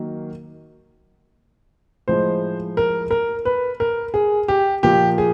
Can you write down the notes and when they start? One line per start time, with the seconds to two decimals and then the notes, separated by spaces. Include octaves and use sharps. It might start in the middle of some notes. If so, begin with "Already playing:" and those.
Already playing: D#3 F#3 A#3
2.08 A2 F3 G#3 C5
2.77 A#4
3.11 A#4
3.45 B4
3.80 A#4
4.14 G#4
4.48 G4
4.83 A#2 F3 A#3 G4
5.18 G#4